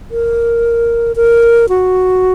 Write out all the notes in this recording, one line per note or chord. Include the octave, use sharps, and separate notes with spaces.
A#4
A#4
F#4